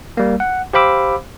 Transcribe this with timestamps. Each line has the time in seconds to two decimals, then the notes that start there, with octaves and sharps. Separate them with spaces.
0.17 G3 A#3
0.40 F#5
0.73 G4 C5 F5 B5 D6 E6